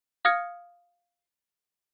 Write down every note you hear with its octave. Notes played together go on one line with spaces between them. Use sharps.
F5 D#6 F6 G#6 C#7